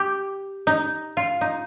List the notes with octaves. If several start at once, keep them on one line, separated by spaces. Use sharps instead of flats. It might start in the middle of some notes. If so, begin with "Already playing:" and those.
Already playing: G4
D#4
F4
D#4